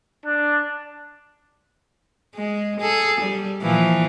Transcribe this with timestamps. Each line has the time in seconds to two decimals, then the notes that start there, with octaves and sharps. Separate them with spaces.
0.25 D4
2.35 G#3
2.80 G#4 A4
3.20 G3
3.61 A#2 E3 F3